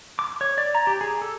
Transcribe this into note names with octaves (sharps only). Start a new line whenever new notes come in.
D6
C#5
D5
A#5
G4
G#4
A4